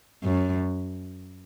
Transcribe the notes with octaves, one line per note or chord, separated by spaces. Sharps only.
F#2